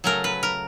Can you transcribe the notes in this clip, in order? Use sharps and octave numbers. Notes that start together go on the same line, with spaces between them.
C#3 F#3 A3 A#4
B4
A#4